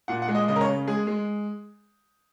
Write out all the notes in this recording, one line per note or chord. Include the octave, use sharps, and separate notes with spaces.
A#2 F#5
F#5
G#3
D#5
C#3 D#5
A#4
C#5
C#3
G#3 G#4
G#3